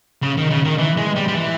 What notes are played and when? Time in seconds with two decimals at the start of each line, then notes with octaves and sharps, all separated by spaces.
0.22 C#3
0.37 D#3
0.50 C#3
0.64 D#3
0.78 E3
0.97 G#3
1.16 G3
1.28 G3
1.34 E3